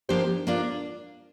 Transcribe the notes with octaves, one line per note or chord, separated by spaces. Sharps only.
F3 A#3 D4 G4 C5
A#3 D4 F4